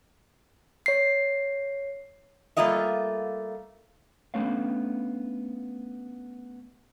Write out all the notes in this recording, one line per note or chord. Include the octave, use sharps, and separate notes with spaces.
C#5 C7
G3 A3 A#3 F4 D#5 E5
A3 B3 C#4 D4 C#5 F5